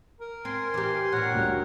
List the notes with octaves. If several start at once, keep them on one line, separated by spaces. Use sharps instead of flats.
A#4
C4 G#5 C6
E3 G4
G2 A#2 A#4 C#5 F#5
D2 G3